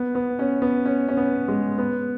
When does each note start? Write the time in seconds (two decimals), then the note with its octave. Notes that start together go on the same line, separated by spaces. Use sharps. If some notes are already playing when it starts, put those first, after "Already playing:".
Already playing: B3
0.15 B3
0.39 C#4
0.62 B3
0.85 C#4
1.08 C#4
1.17 B3
1.48 G#3
1.78 B3